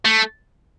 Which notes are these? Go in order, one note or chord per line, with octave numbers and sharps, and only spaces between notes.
A3